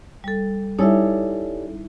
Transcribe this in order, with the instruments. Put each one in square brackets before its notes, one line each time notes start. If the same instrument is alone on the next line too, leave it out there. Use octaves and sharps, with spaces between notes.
[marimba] G3 A4
[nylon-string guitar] G3 C#4 A4 [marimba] D#4 E4 E5